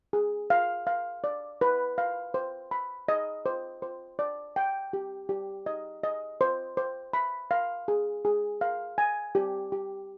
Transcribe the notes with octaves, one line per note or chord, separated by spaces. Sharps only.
G#4
F5
F5
D5
B4
F5
C5
B5
D#5
C5
C5
D5
G5
G4
G4
D#5
D#5
C5
C5
B5
F5
G#4
G#4
F5
G#5
G4
G4